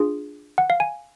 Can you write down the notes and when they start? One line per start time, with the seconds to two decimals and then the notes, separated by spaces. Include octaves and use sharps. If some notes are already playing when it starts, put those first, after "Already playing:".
Already playing: D4 F4 G#4
0.58 F#5
0.70 F5
0.80 G#5